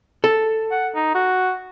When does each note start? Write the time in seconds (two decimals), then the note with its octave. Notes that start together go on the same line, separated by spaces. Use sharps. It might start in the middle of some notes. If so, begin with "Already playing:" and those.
0.24 A4
0.71 F#5
0.95 D#4
1.15 F#4